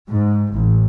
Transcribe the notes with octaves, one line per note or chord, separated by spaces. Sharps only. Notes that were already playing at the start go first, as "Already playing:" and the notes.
G#2
A1